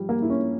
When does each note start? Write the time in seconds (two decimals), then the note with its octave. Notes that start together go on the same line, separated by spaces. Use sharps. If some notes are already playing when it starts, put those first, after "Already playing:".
Already playing: F3 G3
0.09 A#3
0.22 E4
0.30 C#4